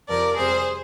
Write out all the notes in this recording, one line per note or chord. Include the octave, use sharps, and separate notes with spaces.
F2 C3 F3 A#4 D5
F2 C3 G3 G#4 C5